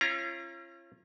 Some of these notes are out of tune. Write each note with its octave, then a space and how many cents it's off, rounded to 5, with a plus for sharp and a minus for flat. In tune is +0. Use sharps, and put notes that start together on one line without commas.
C#4 -35 F4 -40 A#5 +0